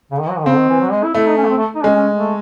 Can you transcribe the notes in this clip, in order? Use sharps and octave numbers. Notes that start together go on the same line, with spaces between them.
C#3
D#3
F#3
D#3
C#3 C4
D#3
E3
F#3
G#3
E4
A3 E4
D#4
C#4
A3
C4
A3
D#4
G#3 C#4
C#4
A3